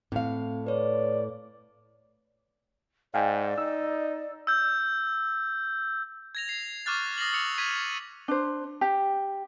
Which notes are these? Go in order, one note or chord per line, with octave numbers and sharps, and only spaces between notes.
A2 C4 F5
B4 C#5 D5
G#2 D5 F5 G5 G#5
D#4 E6
E6 G6
G#6 A#6 F7
C7 F7
C#6 D6 F6 F#6 A6
D#6 A#6 C7 F#7
D#6 E6 C#7 F7
C#6 G#6 B6 D#7 F7
D4 C5
G4